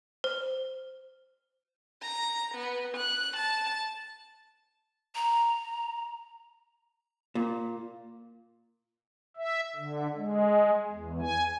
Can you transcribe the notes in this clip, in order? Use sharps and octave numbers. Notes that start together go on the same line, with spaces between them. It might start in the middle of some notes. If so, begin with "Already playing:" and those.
C5
A#5
B3
F#6
A5
A#5
A#2
E5
D3
G#3
E2
G#5